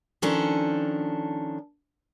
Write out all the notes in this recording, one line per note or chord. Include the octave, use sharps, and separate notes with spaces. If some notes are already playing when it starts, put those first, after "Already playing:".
D#3 F3 C#4 D4 A4